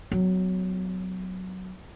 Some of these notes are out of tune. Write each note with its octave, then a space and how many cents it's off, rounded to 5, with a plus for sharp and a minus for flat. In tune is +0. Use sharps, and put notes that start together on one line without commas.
F#3 +5 B3 +40